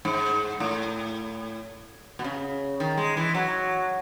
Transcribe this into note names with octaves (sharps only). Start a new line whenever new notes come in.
G#2
A2
B2
C#3
D#3
G#3
E3
F#3